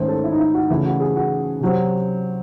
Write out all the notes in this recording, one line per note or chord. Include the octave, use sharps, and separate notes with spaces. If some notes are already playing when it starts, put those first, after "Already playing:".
Already playing: G#2 D#3 A3 C#4 C5
A4
E4
D#4
E4
F#4
C#3 E3 A3 E4
F#4
G#4
F#4
C3 F#3 C4